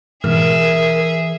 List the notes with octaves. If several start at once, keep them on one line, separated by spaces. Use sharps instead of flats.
G#2 B2 E3 G#4 A#4 E5